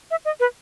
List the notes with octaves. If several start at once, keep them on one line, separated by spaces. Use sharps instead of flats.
E5
D#5
B4